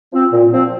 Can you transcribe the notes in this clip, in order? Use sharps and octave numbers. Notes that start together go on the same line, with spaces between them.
F3 C4
A#2
F3 C4